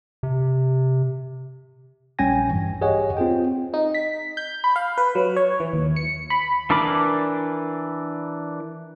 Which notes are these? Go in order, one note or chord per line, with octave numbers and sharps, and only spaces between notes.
C3
A#1 G3 C#4 G5 G#5 A#6
G2 E3
G4 G#4 C#5 D#5 F#5 G#5
C4 F4 G#4 G5
D#4
B6
G6
B5
F5
B4
F#3
C#5
E3
D#2
C#7
B5
E3 D4 A#4 B5 D6